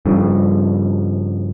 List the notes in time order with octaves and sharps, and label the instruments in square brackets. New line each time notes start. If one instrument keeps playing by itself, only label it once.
[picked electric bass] G2 C#3 F3